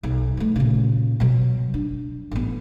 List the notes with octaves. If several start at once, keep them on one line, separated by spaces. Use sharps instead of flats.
B1
F3 A3
A#2 C#3
B2 F#3
D4
A1 B3